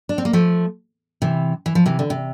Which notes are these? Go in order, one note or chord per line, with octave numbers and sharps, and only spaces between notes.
D4
C4
A#3
F3 A3
C3 E3
E3
F3
C3 E3
D3
C3